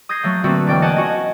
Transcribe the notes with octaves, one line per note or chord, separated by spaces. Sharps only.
D#6 G6 G#6 A#6 C7
F#3 A3 A#3
D3 A3 A#3 C4 F#4 B4
E1 D5 G5 F6
D#5 F#5 G#5 A5
C#4 F#4 D#5